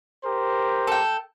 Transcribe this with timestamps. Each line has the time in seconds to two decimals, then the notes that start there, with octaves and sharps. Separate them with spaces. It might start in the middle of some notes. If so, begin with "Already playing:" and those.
0.25 G4 A#4 C5
0.87 A4 G5